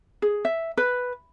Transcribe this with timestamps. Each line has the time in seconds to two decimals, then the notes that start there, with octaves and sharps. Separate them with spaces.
0.22 G#4
0.45 E5
0.77 B4